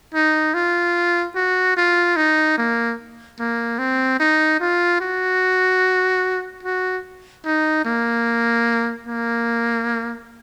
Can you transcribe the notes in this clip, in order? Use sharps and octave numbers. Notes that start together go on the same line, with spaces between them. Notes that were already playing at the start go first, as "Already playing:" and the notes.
D#4
F4
F#4
F4
D#4
A#3
A#3
C4
D#4
F4
F#4
F#4
D#4
A#3
A#3